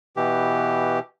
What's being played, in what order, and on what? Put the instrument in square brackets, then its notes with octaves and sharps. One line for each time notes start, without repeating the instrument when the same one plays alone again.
[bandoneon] B2 E3 G4